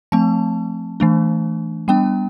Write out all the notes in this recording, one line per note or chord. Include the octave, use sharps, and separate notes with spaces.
F3 A3 C4 A5
E3 A3 D4
G3 B3 D4 G5